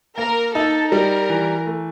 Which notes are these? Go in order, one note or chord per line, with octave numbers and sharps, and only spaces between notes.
A#3 A#4
D#4 A4
G3 A#4
E3
A3